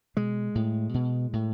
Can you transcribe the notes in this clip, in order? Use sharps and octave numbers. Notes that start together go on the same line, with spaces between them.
B2 G#3
A2
B2
A2